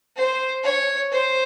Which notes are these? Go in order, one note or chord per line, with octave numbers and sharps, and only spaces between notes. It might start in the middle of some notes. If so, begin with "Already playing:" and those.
C5
C#5
C5